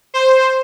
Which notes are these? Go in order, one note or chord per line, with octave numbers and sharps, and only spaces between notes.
C5